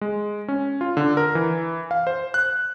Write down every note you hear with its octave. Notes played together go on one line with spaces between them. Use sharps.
G#3
C#4
F4
D3
A#4
E3
F5
C5
F#6